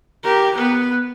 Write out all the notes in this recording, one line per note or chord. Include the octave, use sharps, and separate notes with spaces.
G4 A#4
B3 B4